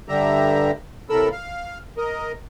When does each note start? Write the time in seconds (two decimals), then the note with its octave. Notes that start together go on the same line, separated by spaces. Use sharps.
0.09 G2 D3 G3 G4 E5 A#5
1.10 A2 C3 A4 A#4 B5 E6
1.32 F5
1.97 A#4 D#5